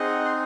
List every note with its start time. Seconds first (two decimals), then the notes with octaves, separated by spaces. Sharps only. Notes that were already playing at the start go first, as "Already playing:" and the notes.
Already playing: C4 D#4 G#4 D#5 F#5
0.25 C6